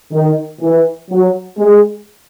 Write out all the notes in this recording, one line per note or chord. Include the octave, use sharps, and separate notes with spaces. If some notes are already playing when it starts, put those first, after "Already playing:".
D#3
E3
F#3
G#3